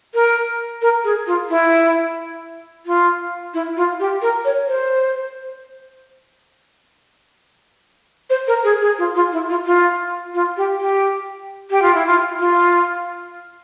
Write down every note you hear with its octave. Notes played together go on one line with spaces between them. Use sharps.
A#4
A#4
G#4
F4
E4
F4
E4
F4
G4
A#4
C#5
C5
C5
A#4
G#4
G#4
F4
F4
E4
F4
F4
F4
G4
G4
G4
F4
E4
F4
F4